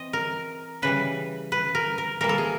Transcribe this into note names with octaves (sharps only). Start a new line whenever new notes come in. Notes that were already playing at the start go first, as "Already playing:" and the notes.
Already playing: E3 C4 D#5
A#4
C#3 E3 G3 B4
B4
A#4
A#4
E3 G3 A#3 A#4
A4
G#4